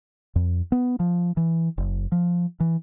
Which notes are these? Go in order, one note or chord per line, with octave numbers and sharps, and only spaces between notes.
F2
B3
F3
E3
F#1
F3
E3